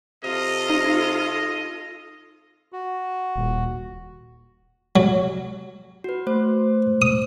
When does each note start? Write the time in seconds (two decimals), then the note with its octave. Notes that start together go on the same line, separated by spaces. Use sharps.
0.24 C3 F4 A4 D#5
0.70 D#4
2.73 F#4
3.36 D#1
4.96 F#3
6.04 F#4 B4
6.27 A3 C5
7.02 D#6